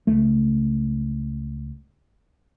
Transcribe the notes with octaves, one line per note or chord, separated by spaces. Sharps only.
C#2 A3